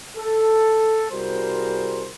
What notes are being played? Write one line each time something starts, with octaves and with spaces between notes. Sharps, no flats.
A4
C2 G3 F#4 G#4 A#4 C5